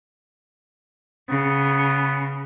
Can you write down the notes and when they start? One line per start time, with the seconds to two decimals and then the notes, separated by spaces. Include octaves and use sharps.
1.30 C#3 B3